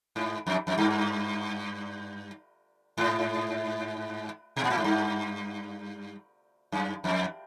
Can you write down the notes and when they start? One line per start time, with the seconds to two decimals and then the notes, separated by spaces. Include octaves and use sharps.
0.16 G#2
0.47 F2
0.67 F2
0.78 G2
2.98 G#2
4.56 B2
4.64 A#2
4.70 A2
4.78 G#2
4.84 G2
6.72 F#2
7.04 F2